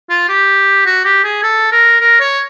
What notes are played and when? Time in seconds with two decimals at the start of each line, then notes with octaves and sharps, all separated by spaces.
0.10 F4
0.29 G4
0.86 F#4
1.05 G4
1.24 G#4
1.43 A4
1.72 A#4
2.01 A#4
2.20 C#5